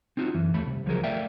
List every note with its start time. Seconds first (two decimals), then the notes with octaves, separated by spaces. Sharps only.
0.17 C4 D#4 F4 F#4
0.34 F#2 E3
0.54 D#2 A3 B5
0.66 C2
0.86 C#2 F3 F#3 G#4 A#4
1.04 A3 A#4 D5 E5 F5 G5